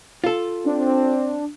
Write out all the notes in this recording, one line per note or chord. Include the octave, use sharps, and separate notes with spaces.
F4 A4
C4 D4